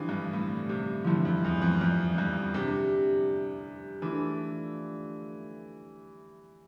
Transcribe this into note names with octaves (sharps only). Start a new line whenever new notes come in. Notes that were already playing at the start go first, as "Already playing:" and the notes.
Already playing: D3 E3 F3 G3 C4
G2
A2
C3
G2 D3 F3 A3 C4 E4
F2
E2
F2
F2
G2
C3 G3 D4 G4
E3 A3 D4 F4 A4